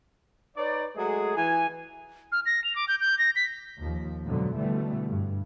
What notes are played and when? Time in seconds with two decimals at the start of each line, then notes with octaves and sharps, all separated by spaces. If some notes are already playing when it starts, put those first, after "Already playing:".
0.56 D#4 B4 C#5 D5
0.96 F#3 G#3 A3 G#4
1.36 E3 G#5
2.32 F6
2.46 A#6
2.64 F7
2.76 D6
2.88 G6
3.01 G6
3.18 A#6
3.36 B6
3.78 D#2 F3
4.26 F2 G#2 B2 D3 F#3
4.57 B2 D3 E3 G3 A3
5.08 G2